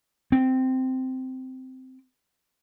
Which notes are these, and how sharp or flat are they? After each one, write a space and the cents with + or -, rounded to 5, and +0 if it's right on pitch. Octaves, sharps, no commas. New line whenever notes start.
C4 -10